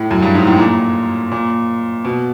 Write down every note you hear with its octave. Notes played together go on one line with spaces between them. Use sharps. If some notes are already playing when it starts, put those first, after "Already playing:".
Already playing: A2
F#2
G2
G#2
A2
A#2
A#2
B2